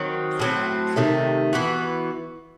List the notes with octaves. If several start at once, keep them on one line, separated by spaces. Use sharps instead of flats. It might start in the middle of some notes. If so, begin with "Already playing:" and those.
Already playing: D#3 F#3 C4
A2 F#3 C4
C3 D#3 A3
E3 B3 F#4